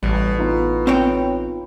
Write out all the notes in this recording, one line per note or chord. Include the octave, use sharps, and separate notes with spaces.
A1 B2 G3
B3 D#4 F4
C4 C#5 G5